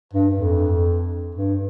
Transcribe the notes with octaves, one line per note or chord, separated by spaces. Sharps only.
G2
F2
G2